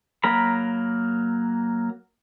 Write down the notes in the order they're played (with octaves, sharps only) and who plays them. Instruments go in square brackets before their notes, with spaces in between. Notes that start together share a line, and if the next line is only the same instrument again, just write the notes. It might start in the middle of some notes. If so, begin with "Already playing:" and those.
[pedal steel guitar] F#3 A#3 A#4 B5